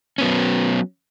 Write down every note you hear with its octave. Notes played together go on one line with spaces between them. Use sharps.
F#3 B3 C#4